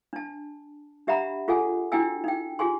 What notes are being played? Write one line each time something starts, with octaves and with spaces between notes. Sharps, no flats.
D4 A5
D4 G4 E5 F#5 A#5 B5
F4 G#4 A4 F#5 G#5
D4 E4 F#4 G5 G#5 E6
D#4 G5
F4 G4 G#4 G#5 C6